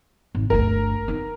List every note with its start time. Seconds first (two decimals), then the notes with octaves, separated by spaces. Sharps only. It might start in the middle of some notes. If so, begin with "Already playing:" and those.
0.35 G#1
0.50 G1 D2 A#4
1.08 B3 D#4